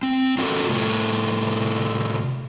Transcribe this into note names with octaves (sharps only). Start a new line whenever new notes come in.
C4
C#4 F4 F#4 A4 A#4
A2 C3 A3